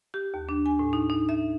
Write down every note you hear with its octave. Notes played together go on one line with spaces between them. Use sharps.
G4
D#2
D4
G#5
A2
D#4
D#4
E5